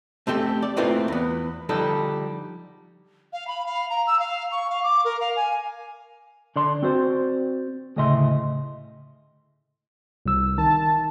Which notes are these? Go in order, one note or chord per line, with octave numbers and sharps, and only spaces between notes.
A3 C4 G4 A4
D5
A3 A#3 C4 E4 F4 B4
E2 B3
D3 F3 G3 D#4 A4
F5
B5
F5
A#5
E6
F5
C#6
F5
D6
A#4
F5
G#5
D3 D5 C6
C4 F#4 C5 D5
D2 A2 C#3 D#5 E5 C6
C2 E6
D#3 A5